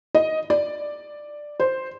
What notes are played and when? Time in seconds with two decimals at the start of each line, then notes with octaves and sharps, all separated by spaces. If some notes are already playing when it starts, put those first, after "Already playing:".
0.15 D#5
0.50 D5
1.60 C5